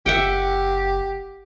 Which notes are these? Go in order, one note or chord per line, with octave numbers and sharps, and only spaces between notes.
F#1 G4 E5 F#5 G5